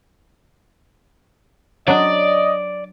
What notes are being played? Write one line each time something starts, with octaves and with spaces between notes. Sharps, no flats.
F#3 D4 D5 D#5